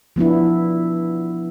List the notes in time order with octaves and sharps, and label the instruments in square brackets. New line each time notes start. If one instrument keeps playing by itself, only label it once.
[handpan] F3 B3 D4 E4